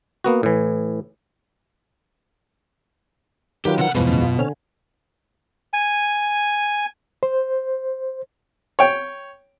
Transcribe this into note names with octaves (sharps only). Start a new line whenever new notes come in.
A#3 B3 F#4
A2 E3
D#3 F#3 F4 G4 A#4 B4
C3 F#5
E2 G2 B2 F3 G#3 B4
F#2 A2 C#3
F#2 F4
D3 C4 C#5 G#5 F6
G#5
C5
C#5 G5